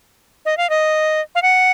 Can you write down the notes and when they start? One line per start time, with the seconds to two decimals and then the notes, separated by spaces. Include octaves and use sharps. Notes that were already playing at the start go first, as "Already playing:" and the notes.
0.46 D#5
0.57 F5
0.70 D#5
1.35 F5
1.43 F#5